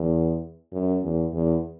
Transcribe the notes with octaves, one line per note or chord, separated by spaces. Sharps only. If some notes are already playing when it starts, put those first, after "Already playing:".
Already playing: E2
F#2
E2
E2